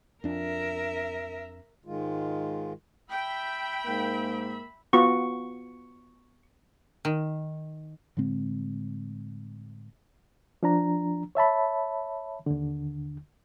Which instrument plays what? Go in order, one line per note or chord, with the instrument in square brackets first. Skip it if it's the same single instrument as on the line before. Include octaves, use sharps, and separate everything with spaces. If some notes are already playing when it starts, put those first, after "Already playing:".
[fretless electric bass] F2 D4 [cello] A#4 E5
[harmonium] G#2 D#3 G#3 F4
[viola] E5 B5 [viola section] G5
[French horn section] G#2 A#3
[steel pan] B3 F4 F#4 [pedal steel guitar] C#6
[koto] D#3
[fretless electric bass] A2 D3 G#3 C4
[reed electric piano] F3 D4 A#5
C#5 E5 A5 B5
D#2 D3